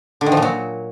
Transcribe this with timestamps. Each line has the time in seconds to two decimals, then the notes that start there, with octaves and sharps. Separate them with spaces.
0.21 D3
0.26 D#3
0.32 F3
0.37 A#2
0.42 F#3